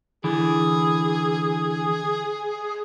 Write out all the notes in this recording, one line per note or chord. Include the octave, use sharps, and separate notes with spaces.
D3 E3 G#4